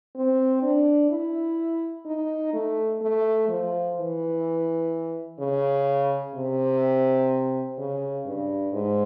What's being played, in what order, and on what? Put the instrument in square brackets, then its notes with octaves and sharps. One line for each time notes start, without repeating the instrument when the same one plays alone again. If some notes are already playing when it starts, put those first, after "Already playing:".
[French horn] C4
D4
E4
D#4
A3
A3
F3
E3
C#3
C3
C#3
G2
G#2